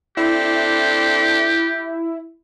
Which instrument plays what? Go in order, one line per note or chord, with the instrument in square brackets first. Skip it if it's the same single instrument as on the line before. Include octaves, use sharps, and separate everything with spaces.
[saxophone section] C4 D4 A4 [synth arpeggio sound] E4 [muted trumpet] G4